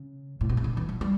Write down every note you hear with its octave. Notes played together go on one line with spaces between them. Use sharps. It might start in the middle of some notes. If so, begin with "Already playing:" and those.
Already playing: C#3
A2
B2
C#3
D3
E3
F#3
G3